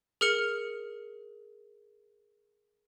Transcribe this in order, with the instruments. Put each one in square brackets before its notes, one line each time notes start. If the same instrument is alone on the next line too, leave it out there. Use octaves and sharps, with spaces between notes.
[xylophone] G#4 A#4 F6 C#7 F7